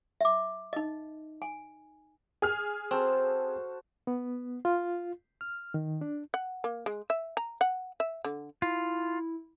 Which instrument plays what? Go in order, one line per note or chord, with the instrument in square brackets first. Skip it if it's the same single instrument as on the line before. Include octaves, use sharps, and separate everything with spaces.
[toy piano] E5 D6
D#4 D#5
G#5
[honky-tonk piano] G#4 F6
[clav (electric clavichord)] C4 [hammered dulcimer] F#4 A4 C5
[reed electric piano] B3
F4
F6
D#3
D4
[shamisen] F#5
A#3
G#3
E5
A#5
F#5
E5
D3
[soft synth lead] E4 [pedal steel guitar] F4